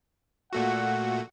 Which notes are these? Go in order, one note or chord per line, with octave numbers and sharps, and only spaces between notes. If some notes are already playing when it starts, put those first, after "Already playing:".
A#2 A3 F#4 F#5